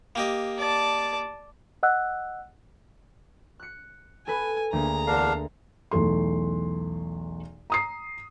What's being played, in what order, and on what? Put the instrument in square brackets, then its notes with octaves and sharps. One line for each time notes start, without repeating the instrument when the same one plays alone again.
[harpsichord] A#3 G4 D#5
[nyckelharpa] D5 A5
[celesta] D#5 F#5 E6 F#6
[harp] F#6 C#7
[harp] A4 B4 [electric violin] G#5
[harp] D2 A#3 G#4 [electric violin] A#5
[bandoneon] E2 D4 F5 [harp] A#4
[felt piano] B1 E2 A3 C6
A#5 D#6 C7